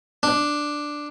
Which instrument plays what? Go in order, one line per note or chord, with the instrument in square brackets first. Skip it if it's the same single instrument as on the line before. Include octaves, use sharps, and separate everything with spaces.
[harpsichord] D4